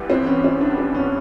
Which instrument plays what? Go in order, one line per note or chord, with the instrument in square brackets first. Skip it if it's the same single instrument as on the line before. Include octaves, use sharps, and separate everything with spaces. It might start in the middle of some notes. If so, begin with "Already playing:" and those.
Already playing: [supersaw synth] G2 E3 G3 B3
[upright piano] C4
C#4
C4
D4
C4
C#4